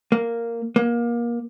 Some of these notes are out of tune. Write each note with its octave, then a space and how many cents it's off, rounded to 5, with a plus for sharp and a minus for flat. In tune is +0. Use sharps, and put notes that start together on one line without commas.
A#3 -5
A#3 +25